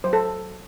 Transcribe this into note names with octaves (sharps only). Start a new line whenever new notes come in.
F#3 C5
A4